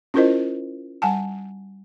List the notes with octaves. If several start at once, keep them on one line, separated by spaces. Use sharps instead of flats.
C#4 E4 F4 A#4 C5 D#5
G3 F#5 G#5 A5